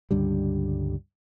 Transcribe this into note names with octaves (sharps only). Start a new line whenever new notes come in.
C#2 G2 D3 G3